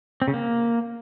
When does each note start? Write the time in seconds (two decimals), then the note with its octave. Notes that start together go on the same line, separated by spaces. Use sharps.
0.22 C4
0.28 C#3
0.34 A#3